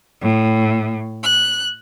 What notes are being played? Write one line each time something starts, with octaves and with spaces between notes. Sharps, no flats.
A2
F#6